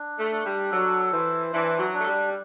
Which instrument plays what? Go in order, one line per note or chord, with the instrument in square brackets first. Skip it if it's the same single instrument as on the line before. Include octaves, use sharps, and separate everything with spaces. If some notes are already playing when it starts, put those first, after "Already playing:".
Already playing: [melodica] D4
[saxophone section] A3
[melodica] D4
[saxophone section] G3
[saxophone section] F#3 [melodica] A4
[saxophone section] E3 [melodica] C5
[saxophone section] E3 [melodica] D4
[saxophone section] F#3
[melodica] D4
[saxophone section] A3
G3